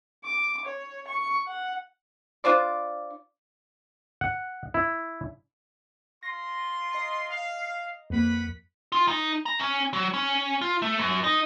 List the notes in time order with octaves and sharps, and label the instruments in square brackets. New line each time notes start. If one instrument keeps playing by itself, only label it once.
[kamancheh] D6
C#5
C#6
F#5
[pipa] D4 F4 C5 D5
[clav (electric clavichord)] F#5
E4
[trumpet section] F4 C6 [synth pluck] A#6
[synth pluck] D#5 A#5
[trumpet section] F5
[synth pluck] F2 A#3 [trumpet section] B4 F#5 B5
[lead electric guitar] F4
D#4
A#5
C#4
F#3
C#4
F4
A3
F#2
D#4